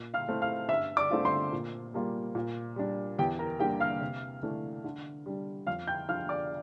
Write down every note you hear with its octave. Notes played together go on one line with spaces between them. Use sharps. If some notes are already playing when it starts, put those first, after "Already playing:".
Already playing: A#2
F5 F6
A3 C4 E4
F5 F6
G2 E5 E6
D5 D6
D3 A3 C4 F4
C5 C6
A#2
G3 A#3 F4
A#2
G3 D4
E2 G4 G5
A#4 A#5
D3 G3 A#3 G4 G5
F5 F6
C3
E3 A3 D4
D3
G3 D4
F2 F5 F6
G5 G6
D3 F3 F5 F6
D5 D6